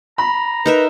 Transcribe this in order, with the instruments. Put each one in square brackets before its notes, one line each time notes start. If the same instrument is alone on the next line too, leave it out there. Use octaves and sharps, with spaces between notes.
[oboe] A#5 [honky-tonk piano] B5
[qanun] D#4 A#4 E5 [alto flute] B4